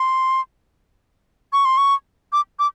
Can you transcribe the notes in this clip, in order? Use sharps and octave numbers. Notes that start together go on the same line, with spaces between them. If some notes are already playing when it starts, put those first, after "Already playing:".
Already playing: C6
C#6
C6
C#6
D6
D6